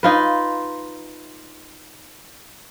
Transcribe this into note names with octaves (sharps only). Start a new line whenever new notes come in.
D#4 F4 B4